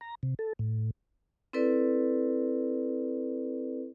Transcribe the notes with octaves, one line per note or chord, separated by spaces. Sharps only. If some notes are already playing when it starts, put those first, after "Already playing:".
A#5
C3
A4
A2
C4 E4 A4 B4 D5